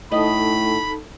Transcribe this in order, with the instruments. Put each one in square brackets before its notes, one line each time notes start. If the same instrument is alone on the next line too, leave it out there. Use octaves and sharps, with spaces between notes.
[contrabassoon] A2 [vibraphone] D#4 A4 A5 [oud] D#5 [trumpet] B5